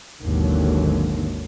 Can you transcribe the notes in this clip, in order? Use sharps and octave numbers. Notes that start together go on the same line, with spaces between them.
G#1 D#2 B2 D3 E3 F#3